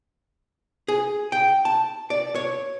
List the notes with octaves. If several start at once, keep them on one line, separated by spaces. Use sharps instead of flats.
G#4
G5
A5
D5
C#5